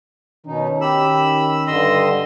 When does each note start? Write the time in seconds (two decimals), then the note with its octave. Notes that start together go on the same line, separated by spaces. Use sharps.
0.46 B2 D#3 C#4 D#4
0.81 G4 B5 E6
1.67 G2 D3 D#5 C6 E6